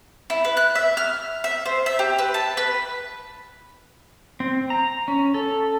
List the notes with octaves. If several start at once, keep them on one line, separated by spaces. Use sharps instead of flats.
E4
B4
F#6
E5
F6
E5
C5
E5
G4
B4
A5
B4
C4
A#5
C#4
A4